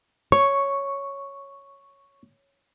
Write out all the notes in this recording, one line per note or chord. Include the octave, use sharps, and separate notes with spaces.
C#5 C#6